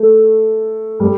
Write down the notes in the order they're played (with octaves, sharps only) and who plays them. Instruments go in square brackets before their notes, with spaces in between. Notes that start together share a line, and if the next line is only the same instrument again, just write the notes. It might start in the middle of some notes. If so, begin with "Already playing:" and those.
Already playing: [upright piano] A3
G3